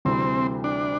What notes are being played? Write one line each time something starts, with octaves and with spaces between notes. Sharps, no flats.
D2 C3 E3 G3 C4
D4